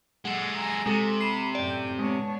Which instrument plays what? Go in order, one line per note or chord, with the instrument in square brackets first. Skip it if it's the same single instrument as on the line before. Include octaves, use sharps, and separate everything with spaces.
[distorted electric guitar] G#3 A4 [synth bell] F#5
[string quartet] G#5 A#5
[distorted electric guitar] C3 [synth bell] G#3 A4 [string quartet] F#4
[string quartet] B5 [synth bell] C7 E7
[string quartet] F#2 A2 G5 [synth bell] D5
[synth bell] G#3 [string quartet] B3 D4 C#5